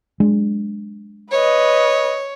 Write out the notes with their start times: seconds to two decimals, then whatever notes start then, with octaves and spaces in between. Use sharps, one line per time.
0.20 F#3 G#3 D4
1.31 B4 C#5 D#5